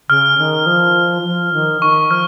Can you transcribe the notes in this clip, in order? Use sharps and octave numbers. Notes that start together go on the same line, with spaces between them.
C#3 F6
D#3
F3
F3
D#3
D#3 C#6
F3 F6